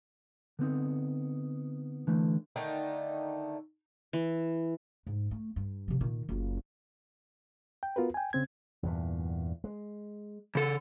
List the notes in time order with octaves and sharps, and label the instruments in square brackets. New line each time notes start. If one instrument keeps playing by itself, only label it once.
[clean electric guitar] D3 B3 C4 D#4
D3 E3 A3
[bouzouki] D3 D#3 A3 D#4
[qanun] E3
[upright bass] G#2
A3
G2
C3 F3
A#2 D#3
F#1 F4
[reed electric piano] G5
B3 F4 F#4 A#4 B4
G5 G#5
C#3 C4 G#6
[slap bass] E2 G2 A#2
G#3
[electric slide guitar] C#3 A4